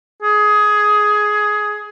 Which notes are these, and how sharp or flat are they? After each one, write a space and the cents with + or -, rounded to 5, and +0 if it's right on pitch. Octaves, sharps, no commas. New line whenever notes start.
G#4 +15